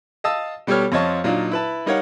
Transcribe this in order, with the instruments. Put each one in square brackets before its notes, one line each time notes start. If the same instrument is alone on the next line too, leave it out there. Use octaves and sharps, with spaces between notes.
[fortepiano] D#5 F5 A5 D#6 E6
B2 G3 G4 A4 C#5 F6
F2 F4 C#5 D#5 A5 C#6
A#2 F#3 D4 D#4 F5
E4 B4 A5
G3 D#4 A#4 C#5 F5 F#5